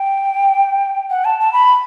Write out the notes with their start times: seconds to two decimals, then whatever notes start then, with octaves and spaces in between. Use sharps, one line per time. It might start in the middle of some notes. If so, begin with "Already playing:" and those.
Already playing: G5
1.11 F#5
1.25 A5
1.40 A5
1.53 B5